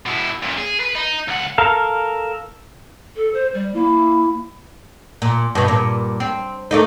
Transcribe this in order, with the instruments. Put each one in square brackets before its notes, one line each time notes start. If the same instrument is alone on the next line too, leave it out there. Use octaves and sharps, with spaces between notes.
[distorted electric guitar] B2 E4
F#2 A#2
G#4
B4
D#4
C#2 F#5
[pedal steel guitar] A4 A#4 F5
[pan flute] A4
C5
G3
[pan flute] A#3 [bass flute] E4
[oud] A#2
G2 B2
G2 A#2
C4
A3 A#3 D#4